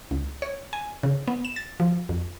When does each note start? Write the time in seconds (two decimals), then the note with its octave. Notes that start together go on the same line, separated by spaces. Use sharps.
0.11 C#2
0.42 C#5
0.73 G#5
1.03 C#3
1.28 B3
1.45 E7
1.56 A6
1.80 F3
2.09 F2